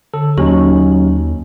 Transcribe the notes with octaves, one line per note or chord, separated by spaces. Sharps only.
D3 A4
D#2 F#3 A#3 C#4 D#4 G4 C#6